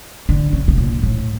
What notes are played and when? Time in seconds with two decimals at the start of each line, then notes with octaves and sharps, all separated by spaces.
0.29 D3
0.53 C#3
0.68 C#3
0.78 A#2
1.03 A2